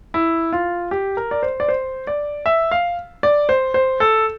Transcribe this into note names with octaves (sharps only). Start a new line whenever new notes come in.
E4
F4
G4
A#4
D5
C5
D5
C5
D5
E5
F5
D5
C5
C5
A4